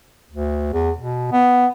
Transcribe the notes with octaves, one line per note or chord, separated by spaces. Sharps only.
D2
E2
B2
B3